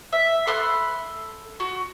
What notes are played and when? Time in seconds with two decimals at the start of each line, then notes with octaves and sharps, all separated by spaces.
0.13 E5
0.47 A4 B5 C6 F#6
1.60 F#4